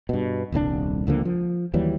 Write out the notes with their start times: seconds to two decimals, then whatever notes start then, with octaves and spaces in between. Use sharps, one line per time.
0.09 G2 B2
0.52 D#1 C2 C3 D4
1.07 C#2 D3 F3 A#3
1.25 F3
1.74 D#2 E3 F#3 G3